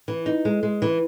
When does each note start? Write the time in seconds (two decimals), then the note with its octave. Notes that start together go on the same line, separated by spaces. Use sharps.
0.08 E3
0.26 D#4
0.45 G#3
0.63 G#3
0.82 E3